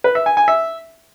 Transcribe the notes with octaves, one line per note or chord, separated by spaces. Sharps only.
B4
E5
G#5
G#5
E5